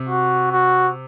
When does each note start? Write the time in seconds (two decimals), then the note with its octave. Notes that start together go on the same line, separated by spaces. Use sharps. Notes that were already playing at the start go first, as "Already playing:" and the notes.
Already playing: C3
0.09 F#4
0.51 F#4